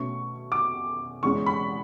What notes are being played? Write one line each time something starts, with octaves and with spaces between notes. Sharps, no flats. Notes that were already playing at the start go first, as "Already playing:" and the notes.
Already playing: B2 A3 C#4 C#6
D6
E2 C#3 G#3 C#4 C#6
B5